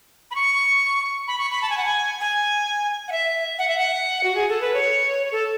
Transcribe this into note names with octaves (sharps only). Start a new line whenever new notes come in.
B5
C#6
B5
C#6
B5
A5
G#5
F#5
G#5
G#5
F#5
E5
F#5
E5
F#5
F#4
G#4
A4
B4
C#5
A4